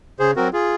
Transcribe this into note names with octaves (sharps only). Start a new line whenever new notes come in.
C#3 G#4 C5
F#3 C4 F#4 A#4
F4 G#4